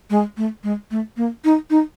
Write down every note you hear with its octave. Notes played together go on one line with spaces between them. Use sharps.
G#3
A3
G#3
A3
A#3
D#4
D#4